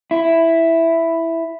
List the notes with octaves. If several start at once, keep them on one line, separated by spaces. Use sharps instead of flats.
E4